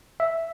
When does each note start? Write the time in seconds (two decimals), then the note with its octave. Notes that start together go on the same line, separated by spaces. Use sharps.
0.20 E5